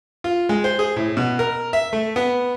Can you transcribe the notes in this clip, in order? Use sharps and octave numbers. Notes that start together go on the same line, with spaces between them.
F4
G#3
C5
G#4
A2
B2
A#4
E5
A3
B3